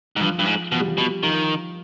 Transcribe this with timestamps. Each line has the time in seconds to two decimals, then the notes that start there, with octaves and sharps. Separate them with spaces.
0.16 G#2
0.21 G2 F3
0.39 G2
0.46 G#2
0.72 B2 F3
0.80 G3
0.88 F3
0.98 B2
1.23 D#3 F3